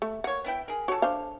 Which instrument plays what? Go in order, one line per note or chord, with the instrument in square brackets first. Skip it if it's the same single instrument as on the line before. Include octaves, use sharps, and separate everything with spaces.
[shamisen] A3
[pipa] A#3 C#5 [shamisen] F#5
[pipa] B3 E4 G5
G#4 A#4
[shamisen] F#4 [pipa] A4 C#5
[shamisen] D4 C5 F5